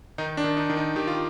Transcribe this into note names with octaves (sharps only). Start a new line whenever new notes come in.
D#3 D#4
D4
D#3
D#4
D#3
D#4
D#3 G4
F4